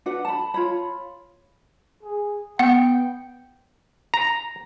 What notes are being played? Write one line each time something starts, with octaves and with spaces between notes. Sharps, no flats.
D4 F#4 B4 F#5
A5 B5
F4 C#5 B5
G#4
B3 F#5 G5
A#5